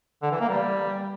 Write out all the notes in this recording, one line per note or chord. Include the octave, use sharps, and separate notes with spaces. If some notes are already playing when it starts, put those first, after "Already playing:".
D3
E3
A#3
G3